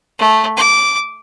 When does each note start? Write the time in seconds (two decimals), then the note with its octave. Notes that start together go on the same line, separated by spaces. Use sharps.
0.19 A3
0.57 D6